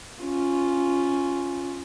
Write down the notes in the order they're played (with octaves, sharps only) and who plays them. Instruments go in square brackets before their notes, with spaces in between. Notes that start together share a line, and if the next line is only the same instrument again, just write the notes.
[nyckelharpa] C#4 F4